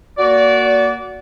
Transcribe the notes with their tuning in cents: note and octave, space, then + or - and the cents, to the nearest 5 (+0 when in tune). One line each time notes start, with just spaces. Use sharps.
A#3 +0 F#4 +0 D5 -25